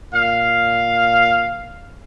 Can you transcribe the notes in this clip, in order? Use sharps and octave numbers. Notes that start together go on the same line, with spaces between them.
A#2 F5